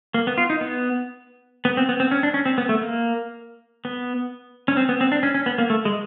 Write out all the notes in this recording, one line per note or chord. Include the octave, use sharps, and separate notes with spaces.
A#3
B3
F4
D#4
B3
B3
C4
B3
C4
C#4
D4
C#4
C4
B3
A3
A#3
B3
C#4
C4
B3
C4
D4
C#4
C#4
B3
A#3
A3
G#3